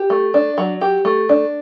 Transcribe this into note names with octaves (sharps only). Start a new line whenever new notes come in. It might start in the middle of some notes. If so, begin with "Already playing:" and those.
Already playing: G4
A3
D4
F#3
G4
A3
D4